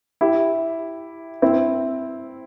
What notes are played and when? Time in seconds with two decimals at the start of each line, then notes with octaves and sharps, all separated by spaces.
0.21 E4 G4
1.42 C4 E4